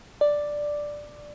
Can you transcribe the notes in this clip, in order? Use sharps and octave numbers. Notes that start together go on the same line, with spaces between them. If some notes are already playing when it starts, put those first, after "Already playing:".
D5